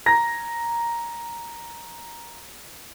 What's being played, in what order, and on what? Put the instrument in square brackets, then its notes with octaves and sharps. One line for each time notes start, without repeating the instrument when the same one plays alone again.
[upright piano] A#5 A#6